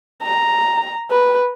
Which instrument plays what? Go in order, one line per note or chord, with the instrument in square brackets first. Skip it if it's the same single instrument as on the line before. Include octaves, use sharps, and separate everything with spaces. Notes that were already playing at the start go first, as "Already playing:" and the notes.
[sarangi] A#5
B4